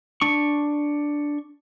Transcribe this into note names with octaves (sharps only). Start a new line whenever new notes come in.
D4 C#6